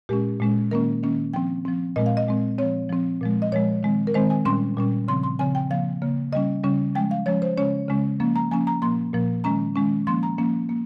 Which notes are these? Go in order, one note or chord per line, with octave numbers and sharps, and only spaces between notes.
A#2 G#3 C#4 G4
A#2 G#3 C#4
D#3 A#3 C#4 A#4
D#3 A#3 C#4
F3 C4 G5
F3 C4
A#2 G#3 C4 D#5
F5
D#5
A#2 G#3 C4
F3 C4 C#5
F3 C4
A#2 F3 G#3
D#5
A#2 F3 G#3 C#5
D#3 G#3 C4
A#4
D#3 G#3 C4 C5
G#5
A#2 G3 C#4 C6
A#2 G3 C#4
C#3 F3 C4 C6
C6
C#3 F3 C4 G#5
G5
C#3 F3 A#3 F5
C#3 F3 A#3
C#3 G3 C#4 D#5
C#3 G3 C#4
F3 G#3 C#4 G5
F5
F3 G#3 C#4 C#5
C5
C#3 G#3 C#4 C#5
C#3 G#3 C#4
F3 A#3 C#4
A#5
F3 A#3 C#4 G#5
A#5
A#2 F3 A#3 C6
A#2 F3 A#3
D#3 G#3 C#4 A#5
D#3 G#3 C#4
F3 A#3 C#4 C6
A#5
F3 A#3 C#4
A#3